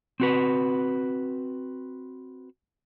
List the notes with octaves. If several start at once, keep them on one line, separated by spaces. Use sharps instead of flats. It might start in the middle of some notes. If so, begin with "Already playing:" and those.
C4 F#4 B4